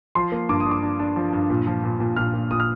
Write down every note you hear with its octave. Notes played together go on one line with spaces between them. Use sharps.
F3 C6
A#3
G2 D6
D#6
D4
D6
D4
D4
F3
G2
A#2
F3
A#2
A#2
A#2 F6
A#2
A#2 D#6
F6